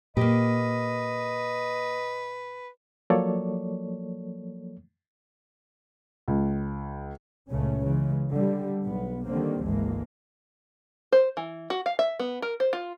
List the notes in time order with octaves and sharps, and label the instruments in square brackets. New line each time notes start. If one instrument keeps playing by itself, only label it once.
[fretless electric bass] A#2 [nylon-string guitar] A#3 G4 [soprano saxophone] B4 [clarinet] D#5
[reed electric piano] F3 F#3 A#3 A4 C#5 D5
[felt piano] C#2
[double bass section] C#2 A#2 C#3 A3 C#4
C#3 E3 G#3
D3 G3
B1 B3
D3 D#3 G3 A#3 C4
G#1 D2 E3 G#3 A#3
[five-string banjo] C5
E3
F#4
F5
E5
B3
A#4
C5
F4